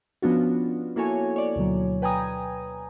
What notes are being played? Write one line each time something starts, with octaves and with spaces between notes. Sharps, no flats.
F3 B3 C#4 D4 F4 F#4
A#3 E4 F#4 A4 C#5 G#5
C#5 D5
D2 B2 D3 F#3
B4 G5 G#5 A#5 D#6